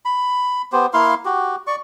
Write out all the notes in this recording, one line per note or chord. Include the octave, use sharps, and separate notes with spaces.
B5
B3 G4 C5
A#3 E4 F5 C6
F#4 G4
D5 C#6